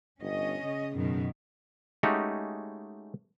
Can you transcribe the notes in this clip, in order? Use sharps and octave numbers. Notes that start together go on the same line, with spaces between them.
G1 C#4 D#5
C#3
F#2 B2 D#3
G#3 A3 C#4 D#4 F#4 G4